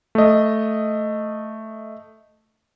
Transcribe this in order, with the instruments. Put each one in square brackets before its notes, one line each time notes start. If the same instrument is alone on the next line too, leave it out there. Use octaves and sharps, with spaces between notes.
[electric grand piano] A3 D#5